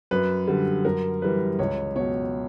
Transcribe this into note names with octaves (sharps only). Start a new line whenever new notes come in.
F#2 B4
D3 G3
F#2 A#4
E3 G3 B4
C#2 C#5
B2 F#3 C#5